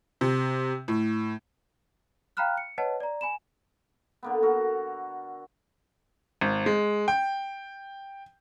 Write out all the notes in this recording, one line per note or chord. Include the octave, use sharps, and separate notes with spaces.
C3
A2
F5 G5 A#5 B5 F6 F#6
C#7
B4 C#5 D#5 F#5 A5
D5 A#5
G#5 B5 E7
D3 A#3 B3
F#4 A4 A#4
G#1
G#3
G5